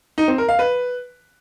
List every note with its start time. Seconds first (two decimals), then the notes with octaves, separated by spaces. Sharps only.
0.18 D#4
0.28 C4
0.38 A#4
0.49 F5
0.59 B4